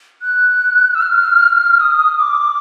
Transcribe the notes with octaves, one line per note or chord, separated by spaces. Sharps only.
F#6
E6
F6
D#6
D6